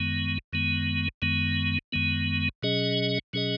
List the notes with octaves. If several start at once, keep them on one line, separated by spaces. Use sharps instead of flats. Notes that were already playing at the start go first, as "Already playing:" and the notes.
Already playing: F#2 D#3 G#3 B3
F#2 D#3 G#3 B3
F#2 D#3 G#3 B3
F#2 D#3 G#3 B3
B2 F#3 C#4 G#4 D#5
B2 F#3 C#4 G#4 D#5